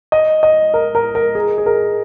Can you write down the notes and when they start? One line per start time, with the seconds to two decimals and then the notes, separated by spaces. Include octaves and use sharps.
0.12 D#5
0.43 D#5
0.74 A#4
0.95 A#4
1.15 A#4
1.35 G#4
1.58 G#4
1.66 A#4